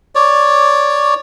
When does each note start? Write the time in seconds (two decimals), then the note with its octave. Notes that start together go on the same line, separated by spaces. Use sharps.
0.15 C#5 D5